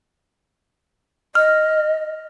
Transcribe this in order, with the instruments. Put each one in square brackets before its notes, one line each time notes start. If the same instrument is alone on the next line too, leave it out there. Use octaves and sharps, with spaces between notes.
[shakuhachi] D#5 [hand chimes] F6